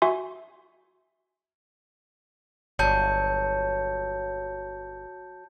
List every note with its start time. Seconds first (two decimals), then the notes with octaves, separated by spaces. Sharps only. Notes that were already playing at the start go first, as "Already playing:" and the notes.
0.02 F#4 E5 G#5 C6
2.79 G1 F#3 A5 G6 C#7